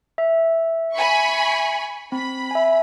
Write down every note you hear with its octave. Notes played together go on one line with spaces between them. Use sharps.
E5
G#5 B5 C#6
C4 B5
E5 G#5